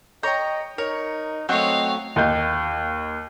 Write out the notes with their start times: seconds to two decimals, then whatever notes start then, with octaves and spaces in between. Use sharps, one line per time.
0.23 C#5 D#5 G5 A#5 C#6 G6
0.78 D#4 A#4 C#5
1.49 F#3 A3 C4 C#5 D#5 F5 F#5 C#6
2.16 D#2 D#5 G6